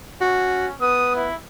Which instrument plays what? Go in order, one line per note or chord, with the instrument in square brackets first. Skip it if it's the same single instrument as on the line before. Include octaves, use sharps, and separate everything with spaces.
[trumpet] C#4 [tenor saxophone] F#4
[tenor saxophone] B3 [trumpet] D#6
[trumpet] E4